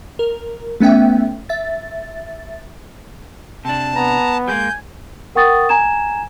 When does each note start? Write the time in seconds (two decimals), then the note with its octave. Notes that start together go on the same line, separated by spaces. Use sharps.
0.19 A#4
0.80 A3 B3 C#4 E5 G5
1.49 E5 A6
3.65 C3 D4 A5
3.96 B3 A#5
4.48 G3 G#3 A#3 G#5 G6
5.35 A#4 F#5 G5 C#6 D#6 A6
5.69 G#5 A#5 G#6 E7